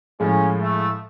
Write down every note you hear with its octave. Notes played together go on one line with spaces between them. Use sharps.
A2 F3 G#3 C#4
A3